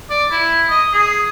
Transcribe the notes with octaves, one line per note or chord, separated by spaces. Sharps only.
D5
E4
D#5
G#4